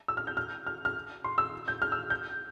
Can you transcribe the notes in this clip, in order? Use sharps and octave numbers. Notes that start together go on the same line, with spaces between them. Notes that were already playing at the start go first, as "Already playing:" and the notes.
E6
F6
G6
F6
F6
F6
C6
E6
G6
F6
E6
G6